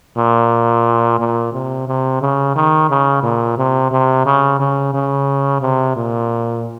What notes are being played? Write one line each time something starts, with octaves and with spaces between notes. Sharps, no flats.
A#2
A#2
C3
C3
C#3
D#3
C#3
A#2
C3
C3
C#3
C#3
C#3
C3
A#2